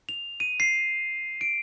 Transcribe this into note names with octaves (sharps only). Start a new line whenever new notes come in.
F7
D#7
C7
D7